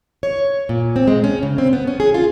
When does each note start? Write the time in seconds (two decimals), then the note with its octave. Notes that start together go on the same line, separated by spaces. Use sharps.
0.23 C#5
0.69 A#2
0.96 C4
1.08 G#3
1.24 C#4
1.43 C#3
1.58 C4
1.73 B3
1.87 C#4
2.00 G#4
2.14 F4